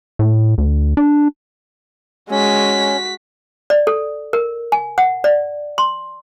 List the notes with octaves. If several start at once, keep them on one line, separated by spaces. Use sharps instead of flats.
A2
D2
D4
G#3 C#4 F#4 B6
D5
A4
A#4
G#5
F#5
D5
C6